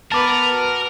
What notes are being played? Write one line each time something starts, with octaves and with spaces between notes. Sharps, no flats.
B3 A#4 B4 A5 D6
F#4